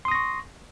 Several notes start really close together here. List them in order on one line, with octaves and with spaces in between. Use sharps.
C6 D#6 A#6 C#6